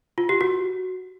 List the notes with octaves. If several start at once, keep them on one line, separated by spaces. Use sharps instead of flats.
F4
G4
F#4